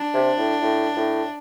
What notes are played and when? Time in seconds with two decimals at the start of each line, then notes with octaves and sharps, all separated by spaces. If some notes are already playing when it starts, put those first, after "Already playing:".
Already playing: D4
0.14 C3
0.38 A2
0.62 A2
0.96 A2